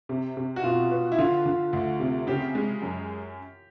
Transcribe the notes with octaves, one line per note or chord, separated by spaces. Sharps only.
C3
C3
F#4
B2 F4
B3
E4
D3 F4
D3
D2
C3
C#3 G4
G#3
F#2